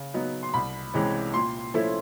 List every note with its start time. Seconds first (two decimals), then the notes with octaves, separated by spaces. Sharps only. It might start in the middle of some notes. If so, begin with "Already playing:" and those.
Already playing: C#3
0.14 F#3 B3 D#4
0.43 C6
0.54 C2 B5
0.94 C3 E3 G#3 C#4
1.34 A#2 C6
1.74 F3 A3 C#4 E4